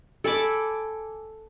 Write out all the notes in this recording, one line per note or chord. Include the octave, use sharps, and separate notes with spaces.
A4 G#5 B5 D6